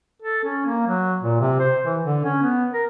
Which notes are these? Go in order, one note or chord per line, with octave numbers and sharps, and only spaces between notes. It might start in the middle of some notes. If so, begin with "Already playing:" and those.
A4
C#4
A#3
F#3
A#2
C3
C5
E3
D3
C#4
B3
A#4